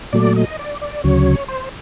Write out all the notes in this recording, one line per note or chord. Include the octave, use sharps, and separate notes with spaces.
A#2 F#3 A3 D5
D#5
D5
D5
D2 C#3 F#3 C#5
C5